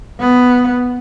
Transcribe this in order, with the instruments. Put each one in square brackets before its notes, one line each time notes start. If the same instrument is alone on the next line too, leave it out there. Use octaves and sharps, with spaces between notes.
[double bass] B3